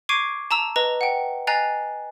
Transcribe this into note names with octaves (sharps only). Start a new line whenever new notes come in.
C#6 D6 G#6 C7 D7 D#7
A5 A#5 E6 F7
B4 D#5 A#5
F#5 G5
D#5 G#5 A#5 F#6 A6 C7